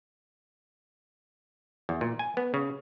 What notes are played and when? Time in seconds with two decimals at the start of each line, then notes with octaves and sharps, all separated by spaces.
1.89 E2
2.01 A#2
2.19 G#5
2.37 B3
2.54 C#3